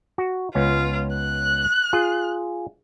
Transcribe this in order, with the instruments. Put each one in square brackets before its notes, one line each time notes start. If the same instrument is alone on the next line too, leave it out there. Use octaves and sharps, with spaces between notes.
[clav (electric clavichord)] F#4
[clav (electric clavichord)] C#2 B3 C#4 [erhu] F4
[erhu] F#6
[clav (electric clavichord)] F4 G#4